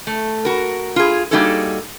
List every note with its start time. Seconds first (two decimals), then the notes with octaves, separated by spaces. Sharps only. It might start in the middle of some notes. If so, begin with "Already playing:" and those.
0.07 A3
0.45 F#4 A#4
0.96 F4 G#4
1.31 G3 A#3 D#4 F#4 G#4 A4